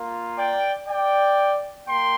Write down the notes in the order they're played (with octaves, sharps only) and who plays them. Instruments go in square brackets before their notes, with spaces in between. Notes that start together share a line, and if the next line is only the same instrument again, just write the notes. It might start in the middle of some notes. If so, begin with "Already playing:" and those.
Already playing: [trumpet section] A#3 F4
D5 G5
D5 G5
A#3 G5 C6